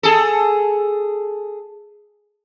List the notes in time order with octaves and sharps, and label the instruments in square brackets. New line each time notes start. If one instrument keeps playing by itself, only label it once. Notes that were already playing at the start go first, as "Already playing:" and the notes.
[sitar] G#4 A4